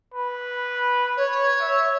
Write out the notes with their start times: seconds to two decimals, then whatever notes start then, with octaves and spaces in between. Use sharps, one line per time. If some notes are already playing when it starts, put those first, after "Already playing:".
0.14 B4
1.16 C#5
1.61 E5